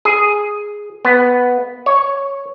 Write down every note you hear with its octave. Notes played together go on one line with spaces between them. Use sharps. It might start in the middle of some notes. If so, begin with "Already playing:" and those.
G#4
B3
C#5